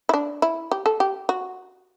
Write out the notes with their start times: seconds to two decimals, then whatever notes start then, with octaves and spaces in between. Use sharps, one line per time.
0.09 E4
0.14 D4
0.42 E4
0.72 G4
0.86 A4
1.00 G4
1.29 F#4